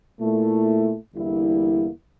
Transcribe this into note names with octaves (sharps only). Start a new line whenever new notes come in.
A#2 A3 E4
E2 D3 G3 A#3 E4